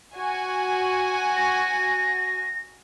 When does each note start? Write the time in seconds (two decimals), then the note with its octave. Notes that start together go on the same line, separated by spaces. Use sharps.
0.15 F#4 G#5
1.36 A#6